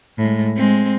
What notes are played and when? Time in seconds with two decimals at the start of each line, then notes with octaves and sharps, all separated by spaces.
0.18 A2 G#3
0.57 G#3 C4